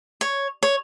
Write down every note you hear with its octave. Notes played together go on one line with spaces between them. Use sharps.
C#5
C#5